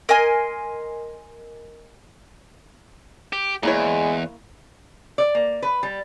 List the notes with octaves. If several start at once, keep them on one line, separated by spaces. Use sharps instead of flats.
A#4 D#5 G#5 C6
G4
E2 G#3 A#3 E4 C#5
D5
A#3
B4
G3